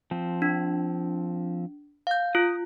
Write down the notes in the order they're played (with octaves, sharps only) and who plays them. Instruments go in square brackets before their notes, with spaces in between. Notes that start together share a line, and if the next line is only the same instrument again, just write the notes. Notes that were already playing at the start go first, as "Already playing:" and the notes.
[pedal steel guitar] F3 C4
[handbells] D4
F5 G6
[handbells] F4 [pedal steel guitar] D#6